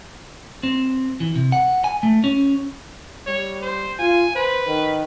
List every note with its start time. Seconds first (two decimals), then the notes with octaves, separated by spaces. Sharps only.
0.63 C4
1.20 E3
1.36 C3
1.52 F#5
1.84 G#5
2.03 A3
2.24 C#4
3.26 G3 C#5
3.62 C5
3.99 F4 G#5
4.36 B4 C5
4.67 D#3